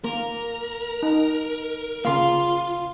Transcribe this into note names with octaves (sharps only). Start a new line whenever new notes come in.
A#3 A#4
D#4
C#3 A#3 F4 F5 C6